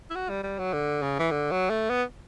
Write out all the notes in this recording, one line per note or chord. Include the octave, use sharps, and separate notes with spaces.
E4
F#4
G3
G3
F#3
D3
C#3
E3
D3
F#3
A3
B3